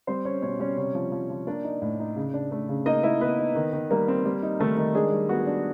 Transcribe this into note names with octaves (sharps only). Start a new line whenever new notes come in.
G3 C4 C5
C4 C#4 C#5
B2 C#4 C#5
G3 C#4 C#5
C3 C#4 C#5
F3
F3
F3
A#3 D4 D5
D#4
A2
D#4
C#3
D4
A3
C#3
A#3 D#4 D#5
A#3 E4 E5
B3 D#4 B4
D#4
D#3
D#3
G3 A#3 A#4
C4
G3
D#4
D#3 A3 A4
D#3
G#3 D4 G#4
G3
B3 F#4
D4